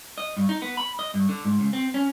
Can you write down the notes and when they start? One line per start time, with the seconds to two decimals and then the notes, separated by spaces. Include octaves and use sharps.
0.18 D#5
0.37 G2
0.49 D#4
0.62 B3
0.77 B5
0.99 D#5
1.14 G2
1.29 D3
1.45 G#2
1.60 C#2
1.73 C4
1.94 C#4